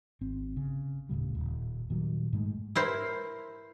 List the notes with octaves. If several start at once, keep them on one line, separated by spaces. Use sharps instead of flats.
G#1 C4
C#3
D#1 A2 C#3 G3
D#1
A#2 D#3 F#3 G3
G#2 G#3 A3
E4 A#4 C5